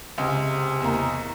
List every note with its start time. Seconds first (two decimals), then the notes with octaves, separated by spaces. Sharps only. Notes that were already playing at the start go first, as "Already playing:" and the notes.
0.18 C#2 C3
0.81 E2 A#3 A#5